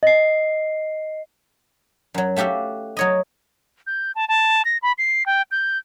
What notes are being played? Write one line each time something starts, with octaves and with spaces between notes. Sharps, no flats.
D#5 C7
F#2 F#3
A3 F#4 G4 A4 F5
F#3 C#5 D#5
G6
A5
A5
A#6
B5
C7
G5
G6